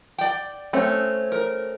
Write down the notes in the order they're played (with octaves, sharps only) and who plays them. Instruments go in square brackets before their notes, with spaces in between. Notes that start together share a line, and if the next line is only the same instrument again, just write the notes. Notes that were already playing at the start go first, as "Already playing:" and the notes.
[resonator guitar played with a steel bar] D5 G5
[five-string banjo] A3 C4 C#4
[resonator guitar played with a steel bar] A#4